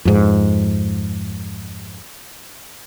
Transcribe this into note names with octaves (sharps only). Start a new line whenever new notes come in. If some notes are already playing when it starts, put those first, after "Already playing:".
F2 G#2